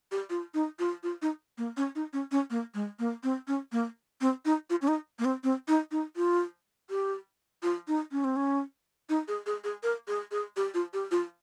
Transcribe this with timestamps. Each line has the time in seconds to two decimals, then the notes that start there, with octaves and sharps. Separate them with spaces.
0.12 G4
0.30 F4
0.54 D#4
0.79 F4
1.03 F4
1.22 D#4
1.58 A#3
1.77 C#4
1.95 D#4
2.13 C#4
2.32 C#4
2.50 A#3
2.74 G#3
2.99 A#3
3.23 C4
3.48 C#4
3.72 A#3
4.21 C4
4.45 D#4
4.70 F4
4.82 C#4
4.88 D#4
5.19 A#3
5.25 C4
5.44 C4
5.68 D#4
5.92 D#4
6.16 F4
6.90 G4
7.63 F4
7.88 D#4
8.12 C#4
8.24 C4
8.36 C#4
9.09 D#4
9.28 G#4
9.46 G#4
9.64 G#4
9.83 A#4
10.08 G#4
10.31 G#4
10.57 G4
10.74 F4
10.93 G4
11.11 F4